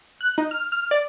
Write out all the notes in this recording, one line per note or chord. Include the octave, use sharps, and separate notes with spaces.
F#6
D#4
F6
F6
D5